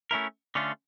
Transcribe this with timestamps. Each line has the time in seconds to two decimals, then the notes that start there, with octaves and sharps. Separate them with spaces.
0.11 A3 C#4 E4 A#4
0.55 D3 A3 C#4 F4